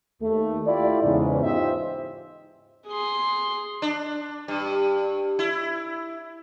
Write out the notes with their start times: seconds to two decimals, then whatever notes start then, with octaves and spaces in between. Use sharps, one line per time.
0.22 D#2 A3
0.67 E4 F4 G4 A4 D5
1.03 E2 G#2 C#3
1.43 D#4 F4 G4 C5 D#5 E5
2.87 G#4 C6
3.82 D4
4.48 G2
5.39 E4